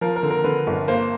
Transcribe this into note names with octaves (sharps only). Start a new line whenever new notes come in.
F3 A#4
A#4
D3
A#4
D3 B4
G1
A#3 C5